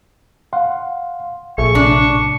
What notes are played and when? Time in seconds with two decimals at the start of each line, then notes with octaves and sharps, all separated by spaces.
0.53 F5 F#5 C6
1.58 A#1 G#4 A4 E5 C#6
1.75 A2 C3 D4